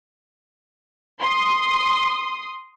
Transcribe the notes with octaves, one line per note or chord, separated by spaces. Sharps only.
C6 D#6